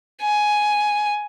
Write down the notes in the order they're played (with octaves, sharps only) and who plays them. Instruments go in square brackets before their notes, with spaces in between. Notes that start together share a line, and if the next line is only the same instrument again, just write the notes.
[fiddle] G#5